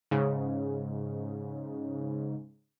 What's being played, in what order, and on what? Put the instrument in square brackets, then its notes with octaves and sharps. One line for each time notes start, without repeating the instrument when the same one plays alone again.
[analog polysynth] G#2 C#3